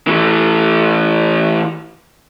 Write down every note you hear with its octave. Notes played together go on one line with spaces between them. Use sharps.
E3 A3